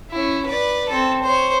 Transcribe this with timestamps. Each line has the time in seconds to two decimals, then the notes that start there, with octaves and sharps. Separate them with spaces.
0.11 C#4 E4
0.46 B4 D5
0.89 C4 A4
1.23 C5 C#5